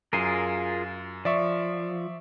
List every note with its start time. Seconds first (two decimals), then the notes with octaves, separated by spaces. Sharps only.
0.13 F#2 F4 G#4 A#4 C7 D#7
1.25 F3 D5 E5 C#6